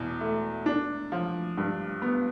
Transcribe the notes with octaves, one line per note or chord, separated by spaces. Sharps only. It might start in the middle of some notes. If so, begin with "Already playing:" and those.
Already playing: E2 B2
A3
D4
F3
G2
B3